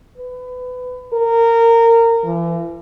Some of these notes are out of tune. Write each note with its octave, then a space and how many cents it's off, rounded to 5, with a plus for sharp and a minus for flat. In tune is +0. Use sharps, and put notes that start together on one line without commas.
B4 +25
A#4 -20
E3 +40